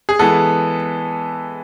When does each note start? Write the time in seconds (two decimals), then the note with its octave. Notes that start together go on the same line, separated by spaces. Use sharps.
0.09 G#4
0.19 E3 G#3 B3 A4